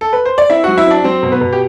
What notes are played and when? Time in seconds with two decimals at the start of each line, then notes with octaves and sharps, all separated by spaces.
0.01 A4
0.13 B4
0.25 C5
0.38 D5
0.50 C4 E4 E5
0.64 F#3 F#4 F#5
0.78 E4 E5
0.87 C4 D4 D5
1.04 F#3 C4 C5
1.23 B2
1.32 B3 B4
1.41 B2
1.53 G4